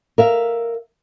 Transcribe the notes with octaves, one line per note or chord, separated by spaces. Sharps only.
A#4 E5 F5